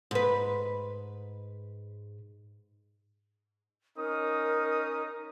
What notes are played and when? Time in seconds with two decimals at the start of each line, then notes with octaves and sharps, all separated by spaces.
0.11 G#2 B4
3.97 C#4 D#4 A#4 D#6